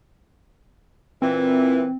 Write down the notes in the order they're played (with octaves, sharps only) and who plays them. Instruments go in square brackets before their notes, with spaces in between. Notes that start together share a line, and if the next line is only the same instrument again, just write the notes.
[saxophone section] A#2 E3 [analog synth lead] C4